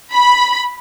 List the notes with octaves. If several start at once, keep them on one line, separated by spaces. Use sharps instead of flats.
B5